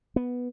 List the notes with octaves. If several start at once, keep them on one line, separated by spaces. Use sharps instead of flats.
B3